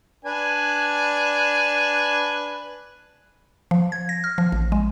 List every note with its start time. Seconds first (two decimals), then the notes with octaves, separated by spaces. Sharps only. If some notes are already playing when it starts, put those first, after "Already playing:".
0.25 D4 B4 G#5
3.71 F3
3.92 G#6
4.09 A#6
4.24 F6
4.38 F3
4.52 A1
4.72 G#3